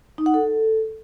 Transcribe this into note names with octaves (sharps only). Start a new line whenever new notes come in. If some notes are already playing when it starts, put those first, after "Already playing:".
D#4
F#5
A4